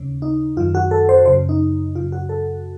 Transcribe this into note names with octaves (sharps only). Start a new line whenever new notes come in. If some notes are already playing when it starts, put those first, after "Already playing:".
Already playing: D#2 C#3
D#4
F#2 D#3 F4
F#4
A4
C5
F#2 C#3 C5
D#4
F#2 C#3 F4
F#4
A4